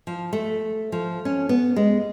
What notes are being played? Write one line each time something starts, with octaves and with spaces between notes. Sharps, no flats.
F3
A3
F3
C#4
B3
G#3